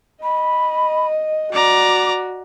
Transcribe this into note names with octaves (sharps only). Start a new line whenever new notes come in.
D#5 B5
F#4 D5 A#5 D6